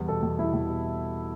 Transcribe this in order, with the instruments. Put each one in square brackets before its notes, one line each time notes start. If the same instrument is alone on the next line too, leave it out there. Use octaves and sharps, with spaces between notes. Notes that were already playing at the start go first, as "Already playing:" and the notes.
Already playing: [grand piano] E2 G3
[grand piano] B2 [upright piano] A4
[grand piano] E2
[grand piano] G3 [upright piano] E4
[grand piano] E2
B2